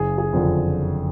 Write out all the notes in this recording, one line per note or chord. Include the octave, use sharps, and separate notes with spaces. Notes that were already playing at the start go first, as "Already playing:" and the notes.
Already playing: F#1 G#4
G#4
F2 D3 F3